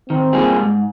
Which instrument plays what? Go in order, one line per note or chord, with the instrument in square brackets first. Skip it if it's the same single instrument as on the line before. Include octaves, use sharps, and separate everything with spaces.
[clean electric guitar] D#3 [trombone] C4
[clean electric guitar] G3 A#3 F4 G#4
G#2